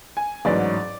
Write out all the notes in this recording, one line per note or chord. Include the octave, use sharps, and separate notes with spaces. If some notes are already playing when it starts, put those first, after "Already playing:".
G#5
A1 G#2 F#3 D5